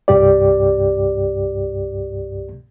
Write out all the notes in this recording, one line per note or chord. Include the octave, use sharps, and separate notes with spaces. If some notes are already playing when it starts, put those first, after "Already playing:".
C2 G2 G4 D5